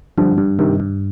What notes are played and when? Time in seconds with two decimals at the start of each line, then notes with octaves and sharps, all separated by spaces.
0.18 G2 D3 F3
0.38 G2
0.59 G2 C3 D#3
0.80 G2